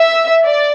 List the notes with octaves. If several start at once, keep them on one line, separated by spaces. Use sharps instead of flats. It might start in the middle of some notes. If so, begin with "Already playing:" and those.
Already playing: E5
D5